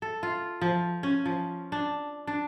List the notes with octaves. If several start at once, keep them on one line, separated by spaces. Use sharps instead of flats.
A4
F4
F3
C#4
F3
D4
D4